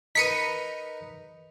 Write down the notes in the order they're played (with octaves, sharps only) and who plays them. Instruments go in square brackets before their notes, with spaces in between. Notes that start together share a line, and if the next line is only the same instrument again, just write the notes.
[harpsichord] D#4 A#4 B4 [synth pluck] B6 C#7 D#7